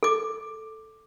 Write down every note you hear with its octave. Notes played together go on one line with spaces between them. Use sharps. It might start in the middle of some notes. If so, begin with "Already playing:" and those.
A4 D6